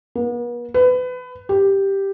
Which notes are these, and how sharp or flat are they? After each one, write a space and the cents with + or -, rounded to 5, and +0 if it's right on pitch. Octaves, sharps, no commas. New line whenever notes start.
B3 -45
B4 +25
G4 +0